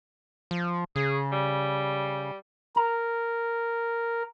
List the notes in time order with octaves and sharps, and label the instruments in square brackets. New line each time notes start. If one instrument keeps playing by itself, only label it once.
[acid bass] F3
[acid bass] C#3 [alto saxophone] G#4
[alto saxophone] G3
[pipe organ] A#4 [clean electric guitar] A#5